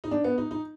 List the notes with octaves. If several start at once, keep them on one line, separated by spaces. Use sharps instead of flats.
D#4
D4
B3
D#4
D#4